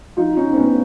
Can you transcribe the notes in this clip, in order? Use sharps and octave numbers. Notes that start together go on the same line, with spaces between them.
F3 D#4 F4
C#4 D#4
C4
A2 B3 C#4